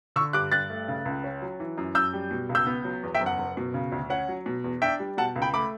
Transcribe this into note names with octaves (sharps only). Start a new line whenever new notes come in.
D3 C#6 E6
G2 D6 F#6
G2 F#6 A6
A3
C#3
C#2
C#4
F#3
E3
F#2
F#2 E6 G6
G3
B2
C#2
E6 G6
B3
F#3
E2
E5 G5
F#1
F#5
F#1
B2
C#3
D2
C#4 F#5
F#3
B2
E2
D4 E5 G5
G3
B2 F#5 A5
C#2
G5 B5
A3 B5 D6